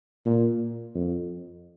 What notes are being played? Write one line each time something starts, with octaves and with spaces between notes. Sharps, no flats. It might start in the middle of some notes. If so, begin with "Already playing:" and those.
A#2
F2